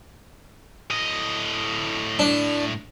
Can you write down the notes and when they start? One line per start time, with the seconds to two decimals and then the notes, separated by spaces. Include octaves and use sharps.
0.90 A2 D#5
2.19 D4